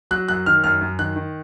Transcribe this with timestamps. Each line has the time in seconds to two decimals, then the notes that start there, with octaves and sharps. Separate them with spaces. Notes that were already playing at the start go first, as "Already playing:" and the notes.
0.11 F#3 F#6
0.28 F#2 F#6
0.46 D#3 F6
0.64 F#2 F6
0.81 F#2
0.99 D#3 F#6
1.16 D#3